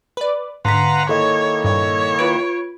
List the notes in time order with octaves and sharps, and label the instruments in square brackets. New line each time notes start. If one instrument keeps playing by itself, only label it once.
[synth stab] B4 D5
[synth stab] G#2 D3 [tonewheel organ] B4 F5 F#5 [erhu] A#5 [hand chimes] C6 B6
[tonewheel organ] D#3 A#3 E4 [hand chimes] A4 D#5 [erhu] C#5
[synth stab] G2 A#2 [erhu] C#5
[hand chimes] F4 G#6 D7 [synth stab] B4